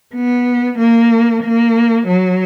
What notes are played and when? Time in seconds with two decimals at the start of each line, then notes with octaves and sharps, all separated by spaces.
0.15 B3
0.79 A#3
1.43 A#3
2.08 F#3